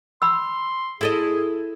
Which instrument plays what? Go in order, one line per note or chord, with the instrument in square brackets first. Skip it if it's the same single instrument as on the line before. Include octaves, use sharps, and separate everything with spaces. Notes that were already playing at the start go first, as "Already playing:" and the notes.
[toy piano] B5 E6 [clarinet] C6
[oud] E4 A4 D#5 [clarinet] G#4